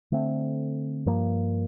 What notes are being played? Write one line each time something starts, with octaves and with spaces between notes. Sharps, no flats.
D3 A3 C4
G2 F3 A#3